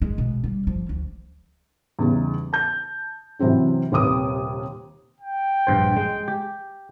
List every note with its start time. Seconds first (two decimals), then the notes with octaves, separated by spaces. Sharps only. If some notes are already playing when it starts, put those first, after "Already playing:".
0.02 G#3
0.18 B2
0.44 G3
0.67 F3
0.89 D2
1.99 E2 C#3 G3 D#4
2.53 A5 G6
3.39 C3 E3 F#3 C4 C#4
3.92 D#1 D#2 C3 B4 D6 D#6
5.20 G5
5.67 A#1 G2 C5
5.96 G#3
6.28 G4